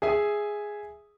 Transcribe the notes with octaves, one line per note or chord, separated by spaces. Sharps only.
G#4 E5 G#5